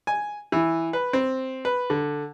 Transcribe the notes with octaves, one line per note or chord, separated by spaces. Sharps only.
G#5
E3
B4
C4
B4
D3